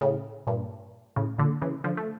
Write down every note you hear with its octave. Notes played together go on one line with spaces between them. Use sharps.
A2 C#3
G2 A#2
A2 C#3
A#2 D3
C#3 E3
D3 F3
A3